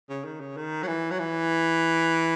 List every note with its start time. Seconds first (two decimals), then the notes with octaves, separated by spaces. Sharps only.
0.09 C#3
0.25 D#3
0.40 C#3
0.57 D#3
0.83 F#3
0.87 E3
1.11 F#3
1.19 E3